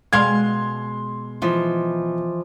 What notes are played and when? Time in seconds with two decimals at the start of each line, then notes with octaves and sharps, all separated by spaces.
0.13 B2 G#3 F5 C6 G#6
1.42 E3 F3 D#5